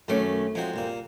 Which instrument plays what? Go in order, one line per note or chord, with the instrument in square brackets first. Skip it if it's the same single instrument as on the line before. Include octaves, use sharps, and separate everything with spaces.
[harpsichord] F#2 C6 D6 [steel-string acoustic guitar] D#3 A3 C#4
[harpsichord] F3 D#4 F#4 [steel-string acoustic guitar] G#3 C4
[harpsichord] C2 A#2 A#3